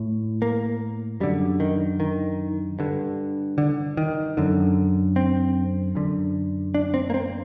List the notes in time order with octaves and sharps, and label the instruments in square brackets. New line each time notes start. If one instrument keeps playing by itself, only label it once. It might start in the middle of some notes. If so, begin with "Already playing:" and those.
Already playing: [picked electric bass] A2
A#3
F#2 D3 G3
D#3
D#3
G2 D3
D3
D#3
F#2 D3
C4
F#2 D3
D4
C4
A#3
C4